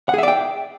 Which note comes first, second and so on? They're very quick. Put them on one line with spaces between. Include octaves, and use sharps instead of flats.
F#5 G#4 E5 D5 G5